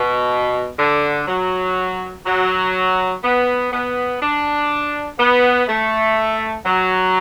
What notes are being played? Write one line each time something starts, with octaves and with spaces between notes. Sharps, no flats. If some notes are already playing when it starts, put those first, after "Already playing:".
Already playing: B2
D3
F#3
F#3
B3
B3
D4
B3
A3
F#3